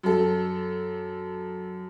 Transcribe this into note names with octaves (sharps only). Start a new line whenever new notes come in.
F#2 A4